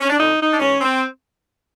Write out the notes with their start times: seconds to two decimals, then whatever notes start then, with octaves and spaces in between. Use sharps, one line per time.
0.01 C#4
0.09 D4
0.18 F2 D3 D#4
0.39 D#4
0.53 D4
0.60 G#2 E3 C#4
0.81 C4